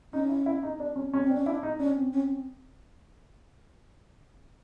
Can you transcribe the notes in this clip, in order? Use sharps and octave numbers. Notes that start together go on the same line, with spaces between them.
C#4 D#4
E4
E4
D#4
D4
C#4
C#4
C4
D4
C#4
D4 E4
D#4
C#4 D4
C4
C#4